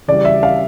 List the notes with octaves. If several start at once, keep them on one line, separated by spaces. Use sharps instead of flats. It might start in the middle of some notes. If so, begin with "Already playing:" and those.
C#3 E3 G3 D5
E5
F5